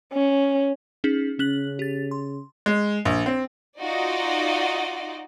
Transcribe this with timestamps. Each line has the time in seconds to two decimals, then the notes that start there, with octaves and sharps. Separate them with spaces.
0.13 C#4
1.04 C#4 D#4 G#4
1.39 C#3 C#4 F#6 F#7
1.79 G4 A6
2.11 C6
2.66 G#3
3.05 A#1
3.26 C4
3.80 D#4 F4 F#4 D5 D#5